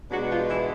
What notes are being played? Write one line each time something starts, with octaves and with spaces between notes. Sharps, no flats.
B2 F#3 G#3 B3 D4 F#4
F3 F4
E3 E4